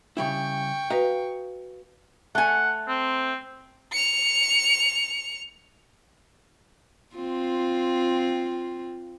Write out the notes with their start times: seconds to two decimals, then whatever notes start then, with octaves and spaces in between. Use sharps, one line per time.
0.17 C#3 G3 E4 G5 C#6
0.90 F#4 B4 D#5 F5 A#5
2.35 A3 F#5 G#5
2.88 C4
3.92 C#7 F7
7.16 C4 F4